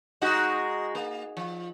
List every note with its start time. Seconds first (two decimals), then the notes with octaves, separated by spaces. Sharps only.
0.21 G#3 D#4 F#4
0.95 A#3
1.37 F3